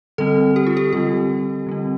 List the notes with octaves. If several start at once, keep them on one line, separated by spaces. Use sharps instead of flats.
D3 G3 C4 A4
G4
F4
G4
D3 G3 C4 G4
D3 G3 C4